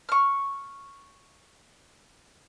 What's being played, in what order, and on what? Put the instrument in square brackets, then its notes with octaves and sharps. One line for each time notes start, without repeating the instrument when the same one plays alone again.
[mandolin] C#6 F6